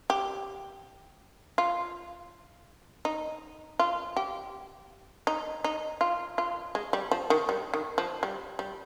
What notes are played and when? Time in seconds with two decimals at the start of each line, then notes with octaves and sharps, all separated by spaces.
0.10 G4
1.58 F4
3.05 D#4
3.80 F4
4.17 G4
5.27 D#4
5.64 D#4
6.01 F4
6.38 F4
6.75 G#3
6.93 G3
7.11 F3
7.30 D#3
7.49 G3
7.74 D#3
7.98 F3
8.23 G3
8.59 G3